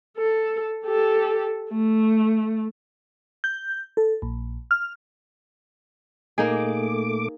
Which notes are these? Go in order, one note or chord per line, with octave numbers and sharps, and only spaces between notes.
A4
G4 A4
A3
G6
A4
A#1
F6
A#2 A3 A#3 D#4 G#4 D6